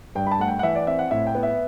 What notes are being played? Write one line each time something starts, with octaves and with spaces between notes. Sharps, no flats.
G2 G5
B5
A5
A3 F#5
G5
F#5
E3 E5
D5
C4 E5
F#5
A2 E5
G5
B3
E5